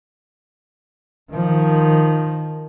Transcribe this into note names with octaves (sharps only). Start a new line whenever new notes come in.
D#3 F3